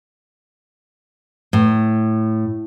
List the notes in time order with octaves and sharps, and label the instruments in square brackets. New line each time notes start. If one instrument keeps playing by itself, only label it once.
[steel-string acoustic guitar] A2